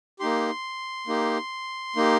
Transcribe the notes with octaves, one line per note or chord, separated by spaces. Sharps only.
A#3 D#4 G4 C6
A#3 D#4 G4
A#3 D#4 G4